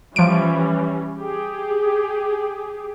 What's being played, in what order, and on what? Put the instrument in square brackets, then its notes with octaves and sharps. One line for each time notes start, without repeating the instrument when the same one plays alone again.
[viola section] E3 G3 C#4 [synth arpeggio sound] F3 D7
[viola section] G4 G#4